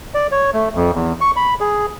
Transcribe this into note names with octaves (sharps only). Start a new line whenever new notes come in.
D5
C#5
A3
F2
E2
C#6
B5
G#4